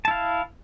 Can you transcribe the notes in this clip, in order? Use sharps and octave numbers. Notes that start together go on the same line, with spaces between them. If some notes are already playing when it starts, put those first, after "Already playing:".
E4 F5 A5